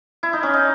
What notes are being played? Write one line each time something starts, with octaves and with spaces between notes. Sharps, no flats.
E4
D#4
C#4
D#4